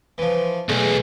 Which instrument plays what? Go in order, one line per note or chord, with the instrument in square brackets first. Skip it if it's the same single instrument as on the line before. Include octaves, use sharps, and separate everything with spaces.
[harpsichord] E3 F3
[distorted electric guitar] B1 [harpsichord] E2 A3 [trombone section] G#3 G#4